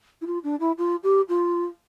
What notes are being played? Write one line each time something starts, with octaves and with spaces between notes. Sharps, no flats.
E4
F4
D4
E4
F4
G4
F4